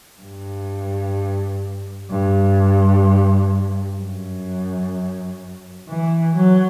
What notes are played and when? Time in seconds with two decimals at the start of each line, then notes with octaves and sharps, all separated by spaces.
0.21 G2
2.10 G2
4.00 F#2
5.89 E3
6.36 F#3